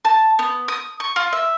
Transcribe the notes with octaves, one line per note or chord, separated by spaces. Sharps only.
A5
B3
D#6
C#6
F4
E5